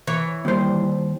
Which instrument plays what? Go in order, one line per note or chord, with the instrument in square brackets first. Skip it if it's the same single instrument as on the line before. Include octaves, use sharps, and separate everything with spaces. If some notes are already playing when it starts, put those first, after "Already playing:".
[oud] E3 C#5
[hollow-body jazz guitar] D#2 C5 [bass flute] G3